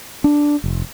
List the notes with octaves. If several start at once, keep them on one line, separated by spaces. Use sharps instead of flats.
D4
F1